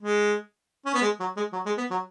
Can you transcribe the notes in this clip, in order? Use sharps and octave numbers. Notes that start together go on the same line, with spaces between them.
G#3
C#4
B3
G#3
F#3
G#3
F#3
G#3
B3
F#3